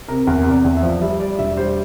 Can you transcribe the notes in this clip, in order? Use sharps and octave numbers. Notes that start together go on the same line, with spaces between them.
C3 A#4
E2 A#4
C3
D5
E2
E5
F3
G3 E5
G3 D5
E1 E5
G3 C5